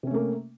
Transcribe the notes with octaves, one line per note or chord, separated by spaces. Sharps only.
C3 A3 A#3 C#4